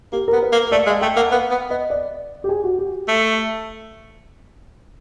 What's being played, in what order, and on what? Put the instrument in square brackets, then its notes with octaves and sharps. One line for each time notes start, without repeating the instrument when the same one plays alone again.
[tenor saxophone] A#3 [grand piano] G4
[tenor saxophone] B3 [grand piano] A#4
[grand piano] B4
[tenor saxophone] A#3
[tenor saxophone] A3 [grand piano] D5
[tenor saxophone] G#3 [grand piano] F5
[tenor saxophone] A3 [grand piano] G5
[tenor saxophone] A#3 [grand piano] F#5
[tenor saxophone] B3 [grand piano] F5
[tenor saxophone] B3
[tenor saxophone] B3 [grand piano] D#5
[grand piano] D5
G4
G#4
F#4
G4
[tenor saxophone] A3